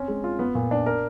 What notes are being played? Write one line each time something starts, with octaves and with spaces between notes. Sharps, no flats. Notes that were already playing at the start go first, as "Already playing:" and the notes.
Already playing: C4 C#4
G#3
F4
B3
A#2
D4
A#4